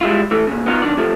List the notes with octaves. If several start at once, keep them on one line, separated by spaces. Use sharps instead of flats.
G3 G#3 E4 F4
E3 A3
A#2 C#3
B3 D#4 F4 F#4 A4 A#4
B1 D#3 D4 D5
B1 C3 F3 A3